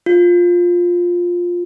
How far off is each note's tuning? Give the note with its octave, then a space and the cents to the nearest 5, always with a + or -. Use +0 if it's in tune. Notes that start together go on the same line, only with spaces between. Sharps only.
F4 +10